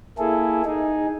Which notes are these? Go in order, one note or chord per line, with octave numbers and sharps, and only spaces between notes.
A#3 E4 G#4 A4
D#4 G#4